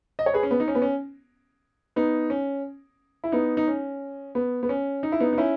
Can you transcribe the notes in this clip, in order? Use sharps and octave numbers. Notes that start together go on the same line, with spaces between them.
D#5
C#5
G#4 B4
C#4
B3
D#4
C#4
B3
C#4
B3 D#4
C#4
E4
B3 D#4
D#4
C#4
B3
B3
C#4
D#4
E4
B3 D#4
D#4
C#4 E4